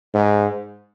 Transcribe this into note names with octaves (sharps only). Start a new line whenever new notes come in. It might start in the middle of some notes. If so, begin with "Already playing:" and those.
G#2